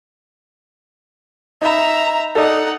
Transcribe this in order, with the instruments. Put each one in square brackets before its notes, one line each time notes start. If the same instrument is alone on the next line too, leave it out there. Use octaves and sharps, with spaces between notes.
[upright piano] D#4 B5 [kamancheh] E5 A#5
[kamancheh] D#4 F#5 [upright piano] A4 D5 D#5